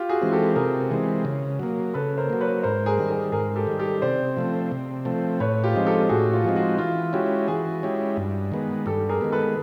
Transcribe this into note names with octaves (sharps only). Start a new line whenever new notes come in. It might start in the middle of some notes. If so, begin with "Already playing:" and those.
Already playing: F4 G4
F#4 G#4
E3 G#3 C4
G4 A4
C3 G#4 A#4
E3 G#3 C4
C#3
F#3 A#3
C#3 A4 B4
A#4 C5
F#3 A#3
B4 C#5
G#2 A#4 C5
G#4 A#4
D#3 G3
G#4 A#4
G#2 G#4 A#4
G4 A4
D#3 G3
G4 A4
C3 C5 D5
F3 A3 C4
C3
F3 A3 C4
A2 B4 C#5
F4 G4
F3 G#3 C4 D#4
G4 A4
A2 F#4 G#4
F4
F3 G#3 C4 D#4
F#4
E3 F4
G#3 C#4 E4 F#4 G4
E3 F#4 G#4
G#3 C#4 E4 G4
G2
D#3 G#3 B3
G2 G4 A4
G#4 A#4
D#3 G#3 B3
A4 B4